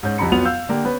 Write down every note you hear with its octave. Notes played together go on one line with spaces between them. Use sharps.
G#2 C#4 G6
C2 F2 C3 A#5 B5 C#7
F2 F#3 B3 F4 F7
F5 E6 G6
D3 A#3 G4
B3 C#4 B4